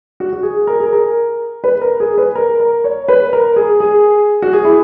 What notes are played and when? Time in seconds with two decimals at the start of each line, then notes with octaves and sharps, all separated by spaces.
0.20 F#4
0.33 F#4
0.43 G#4
0.67 A#4
0.80 G#4
0.93 A#4
1.64 B4
1.82 A#4
2.00 G#4
2.18 B4
2.35 A#4
2.60 A#4
2.84 C#5
3.08 B4
3.33 A#4
3.56 G#4
3.80 G#4
4.42 F#4
4.53 G#4
4.65 E4